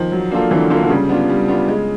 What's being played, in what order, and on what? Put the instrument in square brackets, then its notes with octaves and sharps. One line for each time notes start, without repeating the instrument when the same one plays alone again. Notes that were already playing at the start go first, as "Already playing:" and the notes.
Already playing: [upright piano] D#3 F3
[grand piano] F#3
A#3 D4 F4 A4
[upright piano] D3 E3 [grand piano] F#3
[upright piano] D3 [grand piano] A#3 D4 F4 A4
[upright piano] D3
[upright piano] C#3 [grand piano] G3
[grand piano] B3 D4 F4
G3
B3 D4 F4
G#3